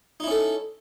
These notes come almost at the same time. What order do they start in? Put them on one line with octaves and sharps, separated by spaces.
D#4 E4 C#4 A4